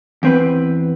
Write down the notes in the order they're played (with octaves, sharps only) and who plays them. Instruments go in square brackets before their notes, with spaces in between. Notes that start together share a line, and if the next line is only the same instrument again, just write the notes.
[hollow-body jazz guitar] E2 C4 B4